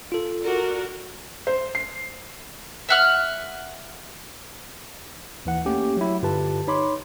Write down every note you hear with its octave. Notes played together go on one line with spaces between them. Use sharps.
F4 A4
F#4 A#4 D5
C5
C7
E5 F#5 F6
D#2 E3 F#5
A3 A#3 C#4 G4
F#3 E4
G2 D3 F4 G4 B4 A5
D#4 C#5 B5 C6 D6